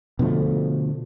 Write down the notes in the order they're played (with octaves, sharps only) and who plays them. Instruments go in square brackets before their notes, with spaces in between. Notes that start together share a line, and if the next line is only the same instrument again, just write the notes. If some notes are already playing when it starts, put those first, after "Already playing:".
[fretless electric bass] B2 D3 F3 A3